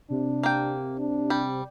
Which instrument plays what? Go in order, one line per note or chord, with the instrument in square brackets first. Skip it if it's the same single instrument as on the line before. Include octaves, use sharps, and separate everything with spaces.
[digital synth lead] C3 [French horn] D4
[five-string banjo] A#3 G5
[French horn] D4
[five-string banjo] G3